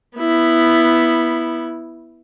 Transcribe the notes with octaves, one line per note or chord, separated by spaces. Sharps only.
B3 E4